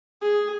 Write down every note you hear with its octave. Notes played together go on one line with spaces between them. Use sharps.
G#4